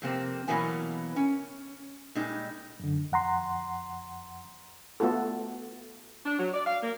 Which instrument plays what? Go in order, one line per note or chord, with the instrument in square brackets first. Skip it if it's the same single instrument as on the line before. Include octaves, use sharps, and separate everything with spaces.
[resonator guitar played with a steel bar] F2 C3 A#3 C4
B2 E3 F#3 A#3 B3 G#5
C#4
A#2 G3 G#3 D#4
[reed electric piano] F#2 D3
F2 F#5 A#5 C6
[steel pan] A3 B3 F4 F#4 A4
[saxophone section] D4
F#3
D5
F5
A#3